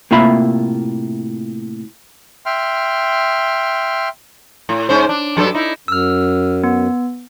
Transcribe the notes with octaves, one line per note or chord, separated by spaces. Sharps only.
A2 C3 A#3 F4 E5 B5
E5 G5 C6 F6
A2
G#2 C#4 C5
D4
G2 F#3 A4
D#4 E4
F#2 E6 F6
B3